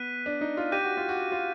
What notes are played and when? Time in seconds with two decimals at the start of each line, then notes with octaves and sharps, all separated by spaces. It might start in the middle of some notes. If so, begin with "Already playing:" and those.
Already playing: B3 F#6 B6 D#7
0.26 D4
0.41 D#4
0.57 F4
0.72 G4 D6 G6 A#6 D#7
0.84 F#4
0.97 F4
1.09 F#4
1.32 F4